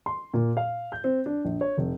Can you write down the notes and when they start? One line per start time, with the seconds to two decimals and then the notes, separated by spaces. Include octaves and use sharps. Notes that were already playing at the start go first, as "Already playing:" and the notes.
0.06 C6
0.34 A#2
0.57 F5
0.92 G6
1.04 C4
1.26 D4
1.45 A#1
1.61 C#5
1.78 F1